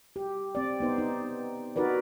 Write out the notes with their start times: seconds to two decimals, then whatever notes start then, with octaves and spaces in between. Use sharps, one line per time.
0.16 G4
0.55 C4 D5
0.80 B3 D#4 C5
0.98 D#4
1.76 D#4 F#4 A#4 B4 D5